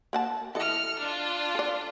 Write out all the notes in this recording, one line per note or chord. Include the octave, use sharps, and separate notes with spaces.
A#3 F#5 A5
E3 A4 D#5 F6 C#7
D4 F4
A4 D5